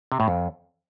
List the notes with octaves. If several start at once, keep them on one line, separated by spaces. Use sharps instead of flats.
C3
A2
F2